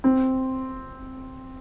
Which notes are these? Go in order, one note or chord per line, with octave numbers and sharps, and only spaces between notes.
C4